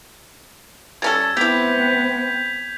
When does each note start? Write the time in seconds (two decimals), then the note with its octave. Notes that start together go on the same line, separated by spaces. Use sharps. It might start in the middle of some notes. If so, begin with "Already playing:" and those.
1.02 G3 C#4 A4 G#6
1.37 B3 C4 E4 G4 G6 B6 F7